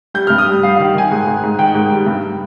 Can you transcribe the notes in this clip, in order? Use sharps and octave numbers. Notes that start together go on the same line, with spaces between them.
G3 G6
G2 F6
D#6
G3
G3 F5
F5
D#3
D#3 G#5
G#2
G#2
G#2
D#3 G5
G#2
G3
G2